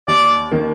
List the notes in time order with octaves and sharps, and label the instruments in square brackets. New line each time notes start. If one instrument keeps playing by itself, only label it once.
[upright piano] D#2 [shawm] D5
[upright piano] D#3 A#3